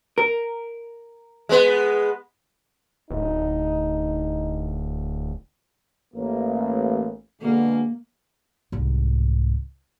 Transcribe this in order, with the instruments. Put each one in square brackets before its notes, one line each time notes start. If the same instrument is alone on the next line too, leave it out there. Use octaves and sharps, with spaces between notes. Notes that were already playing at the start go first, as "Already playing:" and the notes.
[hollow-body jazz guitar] A#4
[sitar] G#3 B3
[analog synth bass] D1 [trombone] D#4
[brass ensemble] A1 A#3
[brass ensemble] B2 D3 G#3 [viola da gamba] A#3
[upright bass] C2 G#2